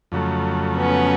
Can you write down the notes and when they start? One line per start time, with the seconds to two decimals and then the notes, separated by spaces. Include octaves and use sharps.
0.12 F2 C#3 F#3 A3
0.76 B3 C#4